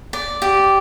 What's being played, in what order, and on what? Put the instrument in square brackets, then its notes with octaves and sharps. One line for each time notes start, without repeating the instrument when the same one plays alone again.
[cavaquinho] D5
G4